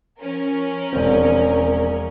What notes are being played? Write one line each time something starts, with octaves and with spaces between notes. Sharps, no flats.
F3 C#4 A#4
E1 C4